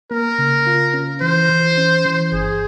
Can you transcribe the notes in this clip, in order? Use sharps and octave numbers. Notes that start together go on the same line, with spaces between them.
A#3 A#4
C#3
F4
C#4
E3 C5
E3
C#4
E3
G1 G#4